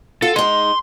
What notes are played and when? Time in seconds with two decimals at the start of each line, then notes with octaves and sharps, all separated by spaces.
0.22 F4 A4
0.36 G#3 D#4 C6